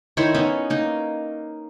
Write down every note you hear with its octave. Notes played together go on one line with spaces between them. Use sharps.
D#3 E4 C5 C#5
B3 C#4 D#4
A#3 D#4